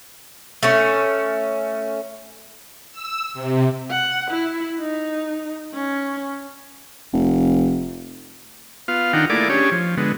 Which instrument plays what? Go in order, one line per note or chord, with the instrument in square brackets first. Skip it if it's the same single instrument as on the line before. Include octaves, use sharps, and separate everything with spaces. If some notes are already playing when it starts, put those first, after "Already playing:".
[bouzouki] A3 C#4
[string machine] E6
C3
[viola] F#5
E4
D#4
C#4
[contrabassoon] F1
[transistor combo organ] B3 F4 F5
D#3 D4 D#4 F4 F#5 G5
A3 A#3 E4 G#4 D5 D6
C#4 D4 G4 G#4 C#5
F3
D3 G#3 B3